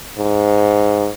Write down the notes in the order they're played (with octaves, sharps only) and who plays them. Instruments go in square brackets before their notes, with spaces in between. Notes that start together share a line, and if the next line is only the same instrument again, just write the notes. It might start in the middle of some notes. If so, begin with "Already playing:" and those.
[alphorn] G#2